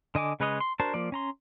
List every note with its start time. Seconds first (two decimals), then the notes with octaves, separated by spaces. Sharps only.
0.15 D3 D#5 G#5 D6
0.40 C#3 G#3 B4 C#5 D#5
0.60 C6
0.80 D4 F#4 A#4 C5 A5
0.94 F3 A#3 D5
1.12 C#4 A#5 C6